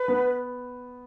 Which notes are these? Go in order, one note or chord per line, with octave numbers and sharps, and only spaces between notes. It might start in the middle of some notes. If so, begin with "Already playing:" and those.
Already playing: B4
B3